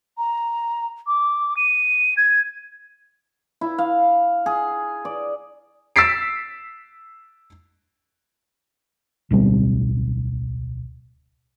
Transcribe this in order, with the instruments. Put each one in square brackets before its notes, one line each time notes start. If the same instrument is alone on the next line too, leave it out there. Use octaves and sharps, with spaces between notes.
[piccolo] A#5
D6
D#7
G#6
[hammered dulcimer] E4
F5
G#4
D5
[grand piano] E6 A6 B6 C7 D7
[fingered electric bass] D1 B1 G3 C4